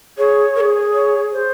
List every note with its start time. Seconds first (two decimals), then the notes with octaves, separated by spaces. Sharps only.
0.18 G#4 C#5
0.56 A#4
0.60 G#4
0.94 C#5
1.32 C5